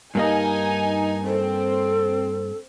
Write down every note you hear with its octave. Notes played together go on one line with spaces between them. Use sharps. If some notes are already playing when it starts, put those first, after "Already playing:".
G2 A#3 D#4 D#5 G#5
C4 A4